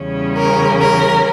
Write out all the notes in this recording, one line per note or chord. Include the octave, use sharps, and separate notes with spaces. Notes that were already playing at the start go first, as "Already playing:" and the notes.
Already playing: E2 C#3 G3 C#4
A#4
A#4